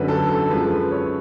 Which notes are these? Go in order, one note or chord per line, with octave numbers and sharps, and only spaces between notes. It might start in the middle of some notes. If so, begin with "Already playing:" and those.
Already playing: F#2 D3 F#3 B4
A4
A4
F#2 F3 G#3 B4
B4
C#5